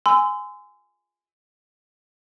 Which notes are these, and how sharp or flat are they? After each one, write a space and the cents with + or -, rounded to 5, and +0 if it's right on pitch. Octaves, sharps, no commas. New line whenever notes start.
G#5 +0 C6 -30 E6 +0